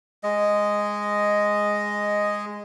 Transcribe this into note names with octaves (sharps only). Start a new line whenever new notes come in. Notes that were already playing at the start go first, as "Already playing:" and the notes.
G#3 D#5